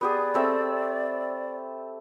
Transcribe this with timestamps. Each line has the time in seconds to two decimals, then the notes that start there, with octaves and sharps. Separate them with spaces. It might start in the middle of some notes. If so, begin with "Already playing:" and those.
0.01 B3 G4 G#4 D5
0.34 A3 C4 E5